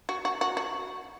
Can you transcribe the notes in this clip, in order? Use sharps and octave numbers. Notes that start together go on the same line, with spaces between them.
F#4
F#4
F#4
F#4